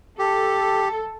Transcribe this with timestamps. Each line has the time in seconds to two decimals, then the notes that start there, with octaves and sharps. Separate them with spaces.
0.19 G4 A4